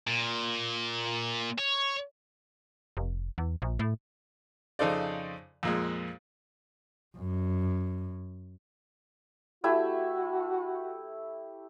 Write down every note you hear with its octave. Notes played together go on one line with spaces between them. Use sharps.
A#2
C#5
F1
E2
A#1
A2
F2 C#3 D#4 A4 C5 D5
F2 A#2 G#3
F#2
A3 E4 F#4 G4